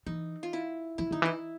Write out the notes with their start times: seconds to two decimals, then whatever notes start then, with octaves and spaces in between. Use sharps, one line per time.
0.06 E3 D#4
0.43 F4
0.53 E4
0.98 E3 E4
1.11 D#3 D#4
1.22 E3
1.25 E4